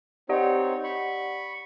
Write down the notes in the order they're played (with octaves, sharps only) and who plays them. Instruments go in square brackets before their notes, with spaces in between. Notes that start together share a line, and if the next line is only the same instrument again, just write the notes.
[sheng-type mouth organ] C4 D#4 C#5 [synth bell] G4 D5 F#5
[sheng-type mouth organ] B5 C#6